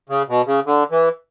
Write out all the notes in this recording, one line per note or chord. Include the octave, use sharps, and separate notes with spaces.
C#3
B2
C#3
D3
E3